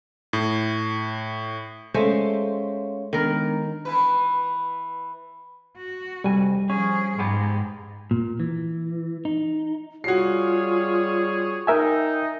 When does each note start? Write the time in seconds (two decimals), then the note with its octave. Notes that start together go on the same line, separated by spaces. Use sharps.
0.33 A2
1.94 G#3 A3 C#4 C5 C#5 F5
3.13 D#3 G#3 B3 D4 A#4
3.85 E3 E4 B4
5.77 F#4
6.24 C2 F2 G3 G#5
6.70 F3 C#4 G#4
7.19 G#2 G#3 B3 G4
8.11 A#2
8.40 E3
9.25 D#4
10.04 G3 F4 F#4 G#4 C#5 C7
11.67 D#4 A#4 E5 G5 G#5